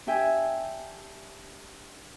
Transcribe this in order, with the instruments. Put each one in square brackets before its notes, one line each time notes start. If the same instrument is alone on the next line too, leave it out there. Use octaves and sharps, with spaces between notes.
[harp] D4 G4 E5 G5 G#5